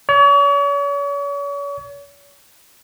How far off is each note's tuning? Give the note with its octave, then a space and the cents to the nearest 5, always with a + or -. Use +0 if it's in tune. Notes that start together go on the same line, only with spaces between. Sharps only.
C#5 +40